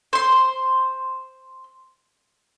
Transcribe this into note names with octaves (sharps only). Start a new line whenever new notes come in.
C5 C6